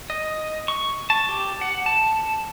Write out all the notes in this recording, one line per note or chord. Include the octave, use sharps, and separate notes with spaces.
D#5
C#6
A5
G4
F#5
A5